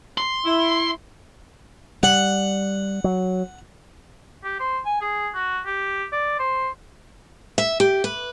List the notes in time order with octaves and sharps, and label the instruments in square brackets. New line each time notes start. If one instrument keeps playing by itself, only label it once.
[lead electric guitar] C6
[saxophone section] E4
[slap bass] G3 [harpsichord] F#5
[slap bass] F#3
[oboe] G4
C5
G#5
G#4
F#4
G4
D5
C5
[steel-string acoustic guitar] E5
G4
B4